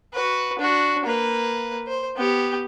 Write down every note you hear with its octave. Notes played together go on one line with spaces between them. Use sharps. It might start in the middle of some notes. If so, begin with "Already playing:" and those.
F#4 B4
D4 F#4
A#3 B4
C5
B3 G4